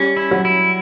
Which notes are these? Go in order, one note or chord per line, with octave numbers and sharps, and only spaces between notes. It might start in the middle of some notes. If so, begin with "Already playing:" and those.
Already playing: G3 C#4
E4
F#3
E4